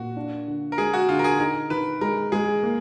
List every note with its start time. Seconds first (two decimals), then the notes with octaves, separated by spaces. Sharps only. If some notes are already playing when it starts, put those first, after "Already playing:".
Already playing: A#2 F#4
0.16 D4
0.48 D3
0.72 A#4
0.78 G#3 G#4
0.93 F#4
1.09 D3 F4
1.19 A#4
1.24 G#4
1.39 D#4 A#4
1.70 D#3 B4
2.01 G#3 A#4
2.32 G#3 G#4
2.63 A#3